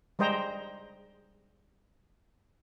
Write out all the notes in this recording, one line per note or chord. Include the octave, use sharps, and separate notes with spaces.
G3 G#3 C5 D#5 G5 A#5